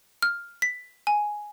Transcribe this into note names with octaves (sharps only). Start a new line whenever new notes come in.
F6
B6
G#5